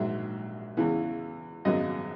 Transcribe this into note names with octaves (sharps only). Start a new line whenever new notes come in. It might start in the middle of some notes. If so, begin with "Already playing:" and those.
Already playing: A#1 G#2 F#3 E5
E2 C#3 E3 B3
G#1 F#2 C#3 F#3 B3 D#5